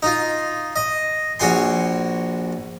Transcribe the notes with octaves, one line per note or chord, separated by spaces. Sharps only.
D#4 F4
D#5
A#1 F#4 C#5 G#5 C6